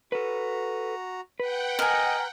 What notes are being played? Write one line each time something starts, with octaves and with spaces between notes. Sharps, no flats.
F#4 A4 B4 A#5
B4 F#5 G5
A#4 D#5 G#5